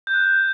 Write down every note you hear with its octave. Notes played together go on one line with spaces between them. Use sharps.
G6
F#6